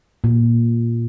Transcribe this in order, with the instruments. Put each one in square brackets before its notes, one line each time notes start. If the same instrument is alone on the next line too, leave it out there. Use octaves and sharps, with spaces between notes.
[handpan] A#2